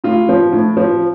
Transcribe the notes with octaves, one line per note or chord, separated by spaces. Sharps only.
A2 F4
F3
A2
F3